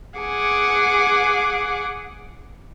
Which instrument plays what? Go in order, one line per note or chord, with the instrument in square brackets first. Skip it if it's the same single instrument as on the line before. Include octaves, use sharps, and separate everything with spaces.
[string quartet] G#4 F#5 G#5 D6